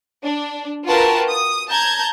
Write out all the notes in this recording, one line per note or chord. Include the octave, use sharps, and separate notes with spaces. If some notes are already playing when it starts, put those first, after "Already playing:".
D4
F4 F#4 A#4 B4 G5 A5
D#6
A5 A#5 G6 G#6